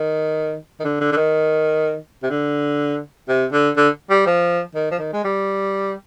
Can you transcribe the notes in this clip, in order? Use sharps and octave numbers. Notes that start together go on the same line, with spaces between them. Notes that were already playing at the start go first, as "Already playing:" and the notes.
Already playing: D#3
D#3
D3
D3
D3
D#3
C3
D3
C3
D3
D3
G3
F3
D#3
F3
D#3
G#3
G3